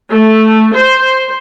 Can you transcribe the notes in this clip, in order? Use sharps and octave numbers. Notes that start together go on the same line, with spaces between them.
A3
C5